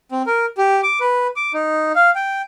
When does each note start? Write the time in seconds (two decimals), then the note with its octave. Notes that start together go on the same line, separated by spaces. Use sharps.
0.11 C4
0.27 A#4
0.58 G4
0.83 D6
1.00 B4
1.36 D6
1.54 D#4
1.95 F5
2.15 G5